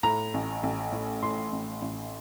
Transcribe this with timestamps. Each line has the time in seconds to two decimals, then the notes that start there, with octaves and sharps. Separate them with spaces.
0.03 A2 A#5
0.34 A1
0.63 A1
0.92 A2
1.22 A2 C6
1.53 A1
1.82 A1